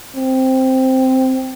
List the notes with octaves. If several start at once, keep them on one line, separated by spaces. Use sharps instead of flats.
C4